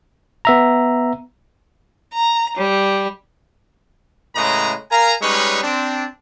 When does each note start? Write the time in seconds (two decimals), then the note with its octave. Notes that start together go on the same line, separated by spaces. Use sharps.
0.45 B3 E5 A#5
2.13 A#5
2.56 G3
4.35 A2 C#3 G#3 B4 D#5 A#5
4.91 A#4 F5 G#5 A#5
5.22 G3 G#3 C#4 D#4 B4 C#5
5.63 C4 D4